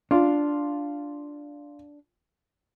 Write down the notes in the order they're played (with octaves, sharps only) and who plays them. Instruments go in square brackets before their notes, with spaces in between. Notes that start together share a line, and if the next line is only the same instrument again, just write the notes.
[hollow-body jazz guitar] D4 [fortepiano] F4